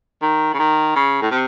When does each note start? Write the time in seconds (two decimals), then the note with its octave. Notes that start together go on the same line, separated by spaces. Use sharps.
0.22 D#3
0.54 C#3
0.59 D#3
0.95 C#3
1.22 A2
1.31 C3